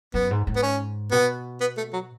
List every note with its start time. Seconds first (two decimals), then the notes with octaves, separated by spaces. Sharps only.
0.14 F#2 B3
0.31 G#2
0.47 G#2
0.56 B3
0.63 C#4
1.11 B2 B3
1.61 B3
1.77 A3
1.93 F#3